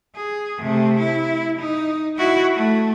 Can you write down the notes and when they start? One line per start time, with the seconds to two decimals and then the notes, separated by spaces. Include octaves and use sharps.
0.16 G#4
0.59 C3 A3
0.99 E4
1.59 D#4
2.16 E4 F#4
2.55 A3